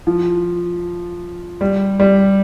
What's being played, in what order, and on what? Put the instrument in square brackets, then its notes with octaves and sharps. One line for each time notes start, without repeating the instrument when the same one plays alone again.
[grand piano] F3
G3
G3